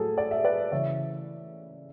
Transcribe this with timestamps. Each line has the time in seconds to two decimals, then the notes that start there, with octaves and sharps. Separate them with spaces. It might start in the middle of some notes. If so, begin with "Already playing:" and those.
Already playing: A2 F#3 G#4 A4
0.18 D5
0.31 E5
0.44 B4 D5
0.72 C#3 E3 C#5 E5